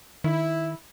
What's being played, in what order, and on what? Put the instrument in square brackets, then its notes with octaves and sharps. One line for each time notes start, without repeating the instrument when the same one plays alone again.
[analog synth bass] D#3 [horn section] E4